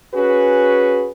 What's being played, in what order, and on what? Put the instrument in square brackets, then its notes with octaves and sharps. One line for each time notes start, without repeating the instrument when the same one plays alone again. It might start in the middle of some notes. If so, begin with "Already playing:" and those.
[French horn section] C#4 F#4 G#4 B4